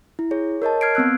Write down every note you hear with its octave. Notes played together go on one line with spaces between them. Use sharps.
E4
G#4 C#5
A#4 C#5 D#5 A5
F6 G#6 C7 D7
B3 C4 E6 F#6